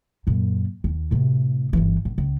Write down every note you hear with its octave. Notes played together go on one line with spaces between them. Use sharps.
F#2 A#2
D#2
A2 C3
G1 E3
A1
C#2